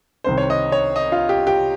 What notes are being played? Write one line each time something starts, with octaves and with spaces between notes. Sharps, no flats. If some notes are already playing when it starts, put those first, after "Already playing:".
C2 C3 D#3 C5
C#5
D#5
C#5
D#5
F4
G4
G4